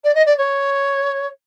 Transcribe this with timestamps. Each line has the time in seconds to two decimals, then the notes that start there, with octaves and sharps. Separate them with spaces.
0.04 D5
0.15 D#5
0.26 D5
0.38 C#5